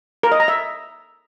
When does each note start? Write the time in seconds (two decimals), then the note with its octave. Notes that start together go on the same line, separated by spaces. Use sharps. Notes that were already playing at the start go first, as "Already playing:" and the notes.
0.23 A#4
0.32 D#5
0.40 A#5
0.48 E5